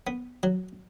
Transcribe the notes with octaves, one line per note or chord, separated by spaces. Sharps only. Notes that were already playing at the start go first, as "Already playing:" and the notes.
B3
F#3